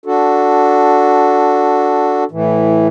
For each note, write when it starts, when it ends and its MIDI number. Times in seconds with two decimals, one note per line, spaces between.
0.06 2.24 62
0.06 2.24 66
0.06 2.24 69
2.31 2.88 45
2.31 2.88 52